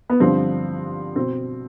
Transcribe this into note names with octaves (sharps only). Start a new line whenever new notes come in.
B3
G2 D3 F3 C4
B2 C4